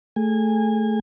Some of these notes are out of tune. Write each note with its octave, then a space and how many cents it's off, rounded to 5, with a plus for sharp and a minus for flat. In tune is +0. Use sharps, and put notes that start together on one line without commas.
A3 +0 G#4 +0 G#5 -25